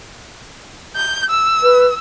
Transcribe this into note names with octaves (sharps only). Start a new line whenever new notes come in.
G6
E6
B4